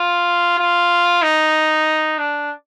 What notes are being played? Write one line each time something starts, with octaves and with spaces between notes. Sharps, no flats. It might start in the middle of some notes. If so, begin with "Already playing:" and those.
Already playing: F4
F4
D#4
D4